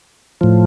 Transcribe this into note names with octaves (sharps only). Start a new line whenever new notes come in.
A2 F3